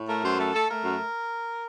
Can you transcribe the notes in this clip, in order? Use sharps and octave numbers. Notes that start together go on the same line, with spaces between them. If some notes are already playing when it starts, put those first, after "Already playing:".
Already playing: A2
A3 A#4
F#2 C5
A3 A4
A3 A4
A3 A#4
F#2